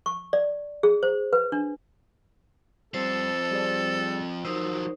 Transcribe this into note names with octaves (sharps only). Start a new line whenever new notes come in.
C#6
D5
G#4
C5
B4
D4
F3 G3 C4 A4 C5
G3 G#4 D5
F3 F#3 D#4 A#4 C5 E6